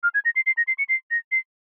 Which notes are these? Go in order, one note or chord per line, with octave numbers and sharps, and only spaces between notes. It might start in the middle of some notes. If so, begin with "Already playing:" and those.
F6
G#6
A#6
C7
C7
A#6
C7
C#7
C7
A#6
C7